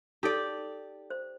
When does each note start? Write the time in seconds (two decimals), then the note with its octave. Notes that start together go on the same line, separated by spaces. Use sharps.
0.23 D#4 G4 A4 D5 A5
1.10 C5